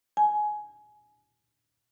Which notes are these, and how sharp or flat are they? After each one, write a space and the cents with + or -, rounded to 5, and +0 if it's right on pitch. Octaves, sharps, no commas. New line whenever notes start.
G#5 +20